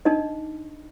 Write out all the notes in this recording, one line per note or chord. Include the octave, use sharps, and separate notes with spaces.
D4 D#4 D#5